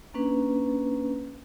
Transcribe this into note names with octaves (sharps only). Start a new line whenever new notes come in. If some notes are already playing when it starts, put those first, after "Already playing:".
A#3 C#4 D4 B4